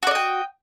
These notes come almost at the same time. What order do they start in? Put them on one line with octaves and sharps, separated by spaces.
F#4 D5 D#5 G5